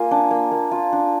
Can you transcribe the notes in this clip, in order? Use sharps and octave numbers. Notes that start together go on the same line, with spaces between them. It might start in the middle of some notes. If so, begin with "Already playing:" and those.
Already playing: A#3 F4 G#5
D4
A#3
A#3
F4
D4